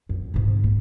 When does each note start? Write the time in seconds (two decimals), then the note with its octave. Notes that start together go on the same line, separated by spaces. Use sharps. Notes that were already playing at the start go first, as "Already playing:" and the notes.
0.09 F#2
0.34 G#2 C3
0.64 A#3